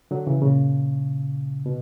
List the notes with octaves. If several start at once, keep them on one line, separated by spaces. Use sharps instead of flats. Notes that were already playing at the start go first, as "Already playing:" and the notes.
D3 F#3
C#3 E3
A#2 C#3
B2